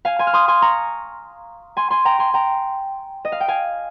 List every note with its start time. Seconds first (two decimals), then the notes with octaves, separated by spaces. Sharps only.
0.05 F5 G#5
0.19 G#5 C6
0.27 F6
0.33 C6 D#6
0.48 G#5 C6
0.62 A#5 C#6
1.77 G#5 C6
1.90 G#5 C6
2.05 G5 A#5
2.19 G#5 C6
2.34 G5 A#5
3.25 D#5
3.32 F5
3.40 G5
3.48 F5 G#5